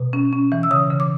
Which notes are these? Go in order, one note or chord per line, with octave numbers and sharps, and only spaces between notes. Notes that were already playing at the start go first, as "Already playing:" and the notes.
Already playing: B2
C#4
C#4
E3
E6
C#3 D#6
C#3
D6